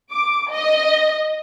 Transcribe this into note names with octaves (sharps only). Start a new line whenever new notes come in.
D6
D#5